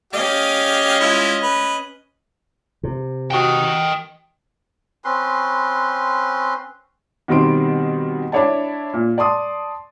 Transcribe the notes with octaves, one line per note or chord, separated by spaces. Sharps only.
C#4 G4 D#5 F5
G#3 E4 F4
B4
C3
F#4 D#5 G5
C4 C#4 B4 C6
B2 D#3 G3 C4 C6 D7
D4 E4 C#5 D5 A5
A#2
D5 A5 C6 D#6